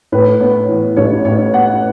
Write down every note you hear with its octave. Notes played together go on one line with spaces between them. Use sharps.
A2 B4
B3 C#5
E3
A1 C#5
A2 C#5
B3 F#5